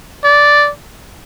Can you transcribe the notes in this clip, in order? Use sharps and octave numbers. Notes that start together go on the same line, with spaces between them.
D5